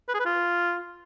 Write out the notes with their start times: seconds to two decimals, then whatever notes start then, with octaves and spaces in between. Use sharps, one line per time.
0.08 B4
0.14 G#4
0.20 B4
0.25 F4